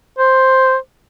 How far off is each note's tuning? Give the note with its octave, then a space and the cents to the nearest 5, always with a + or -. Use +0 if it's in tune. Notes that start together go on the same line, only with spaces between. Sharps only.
C5 +5